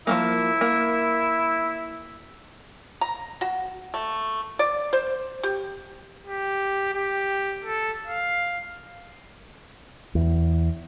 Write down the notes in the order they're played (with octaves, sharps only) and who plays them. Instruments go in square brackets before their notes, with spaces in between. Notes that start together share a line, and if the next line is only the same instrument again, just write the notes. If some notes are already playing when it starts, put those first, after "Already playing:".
[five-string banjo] F3 G3 A#3 [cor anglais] E4
[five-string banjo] A#3
[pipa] A#5
F#4
A3
D5
C5
G4
[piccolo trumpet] G4
G4
A4
F5
[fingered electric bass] E2